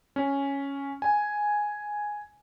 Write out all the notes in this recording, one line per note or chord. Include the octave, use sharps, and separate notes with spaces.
C#4
G#5